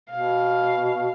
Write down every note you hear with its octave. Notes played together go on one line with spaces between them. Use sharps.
B2 F5